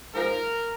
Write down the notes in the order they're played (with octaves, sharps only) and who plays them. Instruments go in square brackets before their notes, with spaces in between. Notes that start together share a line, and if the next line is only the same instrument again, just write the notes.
[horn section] G#2 F3 A#4